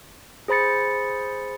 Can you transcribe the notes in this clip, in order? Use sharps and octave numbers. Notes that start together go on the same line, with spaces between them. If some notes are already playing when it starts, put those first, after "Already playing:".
G#4 C5 B5 A6 C#7